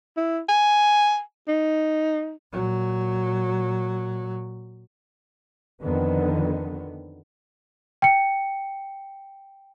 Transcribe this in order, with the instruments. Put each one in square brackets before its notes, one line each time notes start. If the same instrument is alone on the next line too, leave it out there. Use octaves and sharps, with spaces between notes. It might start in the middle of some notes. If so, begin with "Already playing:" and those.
[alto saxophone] E4
G#5
D#4
[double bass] A#2 F#3
[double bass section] F2 D3 D#3 B3
[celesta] G5 C#7